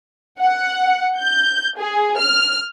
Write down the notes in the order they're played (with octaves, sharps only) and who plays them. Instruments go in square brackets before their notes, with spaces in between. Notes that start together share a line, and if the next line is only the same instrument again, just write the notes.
[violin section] F#5
G6
G#4
F6